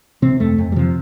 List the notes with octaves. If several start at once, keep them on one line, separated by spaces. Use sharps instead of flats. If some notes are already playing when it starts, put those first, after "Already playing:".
C3 C4
F2 A3
F2
G3
C3 F3